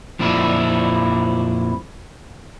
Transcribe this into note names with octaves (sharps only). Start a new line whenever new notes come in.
F2 A#2 F3 D4 E4